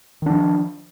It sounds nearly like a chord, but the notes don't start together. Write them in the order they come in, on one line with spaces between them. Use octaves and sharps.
D#3 D4 F3